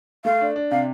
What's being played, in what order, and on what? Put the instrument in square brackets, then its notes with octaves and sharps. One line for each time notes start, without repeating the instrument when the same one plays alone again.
[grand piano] A3 [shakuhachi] F5
[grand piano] D4
D4
[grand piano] C3 [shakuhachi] F5